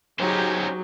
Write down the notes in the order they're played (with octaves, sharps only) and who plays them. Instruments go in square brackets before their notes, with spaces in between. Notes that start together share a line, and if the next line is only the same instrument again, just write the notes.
[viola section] F#3 G#4 [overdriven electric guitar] C#4 C5 [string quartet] D#4 G4